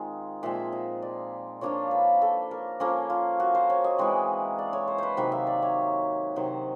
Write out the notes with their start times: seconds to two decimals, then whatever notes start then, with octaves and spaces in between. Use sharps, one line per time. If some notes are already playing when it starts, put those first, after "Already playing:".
Already playing: D#3 G#3 C4 F4 F5
0.43 A#2 F3 G#3 C4 E5
0.72 D#5
1.02 D5
1.61 F3 A#3 D4 F4 C#5
1.91 B4
2.22 A4
2.51 A#4
2.80 F3 A#3 C#4 A4
3.10 F4
3.40 F#4
3.55 C5
3.70 C#5
3.84 D#5
3.98 E3 G#3 C4
4.58 D5
4.73 C#5
4.88 C5
4.98 B4 C5
5.17 C3 D#3 F#3 A#3 B4
5.32 E5
5.47 D5
5.62 C#5
6.36 C3 D#3 F#3 C5